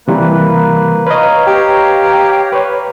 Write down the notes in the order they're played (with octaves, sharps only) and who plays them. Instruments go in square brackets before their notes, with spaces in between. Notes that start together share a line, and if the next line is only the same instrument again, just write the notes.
[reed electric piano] C3 E3 G3 [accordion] A#3 B4
[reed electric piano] B4 D#5 [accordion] C#5 F5 A#5
[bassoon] G4
[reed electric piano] B4 C#5